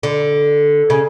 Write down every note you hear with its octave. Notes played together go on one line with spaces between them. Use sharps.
D3
C#3